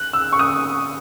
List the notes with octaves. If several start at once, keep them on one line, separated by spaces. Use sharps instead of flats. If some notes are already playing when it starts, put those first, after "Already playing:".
Already playing: F#6
E6
C#6
D#6